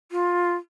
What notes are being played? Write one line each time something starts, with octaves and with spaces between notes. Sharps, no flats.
F4